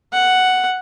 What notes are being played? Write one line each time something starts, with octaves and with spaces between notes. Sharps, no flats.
F#5